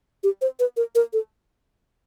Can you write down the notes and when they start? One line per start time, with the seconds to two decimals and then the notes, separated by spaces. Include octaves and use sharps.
0.23 G4
0.41 C5
0.60 B4
0.77 A#4
0.95 A#4
1.13 A4